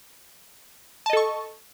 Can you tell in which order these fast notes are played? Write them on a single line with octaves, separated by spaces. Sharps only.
A5 D#5 A4 C#6